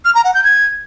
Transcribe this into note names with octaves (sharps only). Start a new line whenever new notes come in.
F6
A#5
F#5
G6
G#6